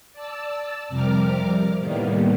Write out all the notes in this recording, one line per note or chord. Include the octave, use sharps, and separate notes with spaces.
D5 A5 E6
F2 C3 G3 A#4 D6 F6
A2 D#3 G3 A#3 B3